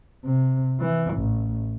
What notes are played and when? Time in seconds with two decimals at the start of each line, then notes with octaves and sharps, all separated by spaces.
0.25 C3
0.80 E3
1.14 A1